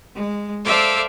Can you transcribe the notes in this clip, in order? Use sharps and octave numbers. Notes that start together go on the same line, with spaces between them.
G#3
A4 C5 D5 E5 F5 D6